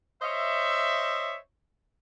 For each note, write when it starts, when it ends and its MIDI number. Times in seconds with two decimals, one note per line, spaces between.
0.22 1.35 72
0.22 1.35 73
0.22 1.35 75
0.22 1.35 76